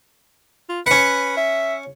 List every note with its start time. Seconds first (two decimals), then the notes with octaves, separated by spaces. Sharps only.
0.69 F4
0.86 C#4 B4 F#5
1.37 E5